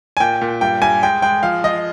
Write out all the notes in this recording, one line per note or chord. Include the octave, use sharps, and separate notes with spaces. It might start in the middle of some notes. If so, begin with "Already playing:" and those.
G#5
A#2 G5
A#2
G2 G5
G2 G#5
G#3 G5
G#3 G5
F3 F5
F3 D#5